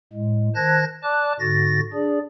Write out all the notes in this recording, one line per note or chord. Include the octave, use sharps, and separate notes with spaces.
A2 G#3
D#3 C5 A5 F#6 G#6 A#6
D5 A5 D6 F#6
G#2 D3 F#4 A6 A#6
D4 G#4 D5